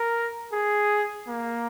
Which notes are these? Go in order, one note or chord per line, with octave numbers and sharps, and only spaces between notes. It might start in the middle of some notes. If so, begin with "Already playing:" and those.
Already playing: A#4
G#4
A#3